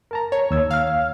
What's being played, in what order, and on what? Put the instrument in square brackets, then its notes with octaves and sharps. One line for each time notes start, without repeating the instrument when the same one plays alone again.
[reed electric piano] A#4 A5 A#5
[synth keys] C#5
[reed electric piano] D#2 E6 G#6
[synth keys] F5 F6